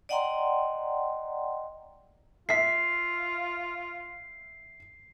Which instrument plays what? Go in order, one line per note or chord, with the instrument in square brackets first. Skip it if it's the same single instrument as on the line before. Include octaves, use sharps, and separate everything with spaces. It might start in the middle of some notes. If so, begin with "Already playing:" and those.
[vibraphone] D5 D#5 F#5 G5 A#5 C6
[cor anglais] F4 [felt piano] E5 B6 [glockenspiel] C7